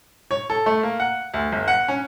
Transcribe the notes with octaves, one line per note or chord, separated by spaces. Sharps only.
C#5
A4
A3
A#3
F#5
D2
G1
F#5
C#4